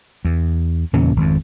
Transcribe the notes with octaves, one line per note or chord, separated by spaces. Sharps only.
E2
E2 A#2 C#3 C#4
G#1 F2